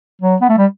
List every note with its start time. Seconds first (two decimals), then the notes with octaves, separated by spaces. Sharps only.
0.22 F#3
0.41 B3
0.49 A3
0.58 G3